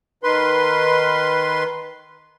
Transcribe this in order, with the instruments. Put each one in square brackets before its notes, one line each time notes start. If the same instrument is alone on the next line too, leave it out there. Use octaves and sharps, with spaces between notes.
[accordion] D#3 B4 C6